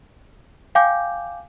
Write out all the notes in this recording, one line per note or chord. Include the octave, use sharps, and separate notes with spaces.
F5 G5 G#5 D6 G6